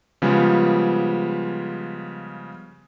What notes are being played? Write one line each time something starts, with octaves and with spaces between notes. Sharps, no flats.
C#3 F3 G3 G#3 B3